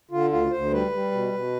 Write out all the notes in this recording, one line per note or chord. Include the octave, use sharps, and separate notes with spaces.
D3 F4
D2 F4
D2 C5
G3 B4
G3
B2
B2